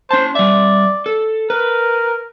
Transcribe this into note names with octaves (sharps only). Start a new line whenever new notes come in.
C#4 C5 A5
G3 D5 E5
A4
A#4 B4